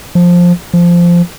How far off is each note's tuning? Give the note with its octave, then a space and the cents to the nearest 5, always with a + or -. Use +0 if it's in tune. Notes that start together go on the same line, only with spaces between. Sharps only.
F3 +10
F3 -10